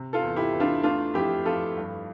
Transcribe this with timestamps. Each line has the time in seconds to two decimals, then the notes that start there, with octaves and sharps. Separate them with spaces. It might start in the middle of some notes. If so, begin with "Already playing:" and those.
Already playing: C3
0.13 F4 A4
0.22 E2
0.36 E4 G4
0.52 E2
0.60 D4 F4
0.83 A3 D4 F4
1.14 F2 E4 G4
1.45 F2 F4 A4
1.77 G2